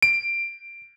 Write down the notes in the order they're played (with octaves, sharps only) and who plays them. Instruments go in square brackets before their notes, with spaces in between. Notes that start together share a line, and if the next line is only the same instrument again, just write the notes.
[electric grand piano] D7